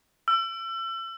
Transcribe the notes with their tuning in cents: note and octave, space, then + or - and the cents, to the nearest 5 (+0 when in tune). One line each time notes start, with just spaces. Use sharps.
E6 +35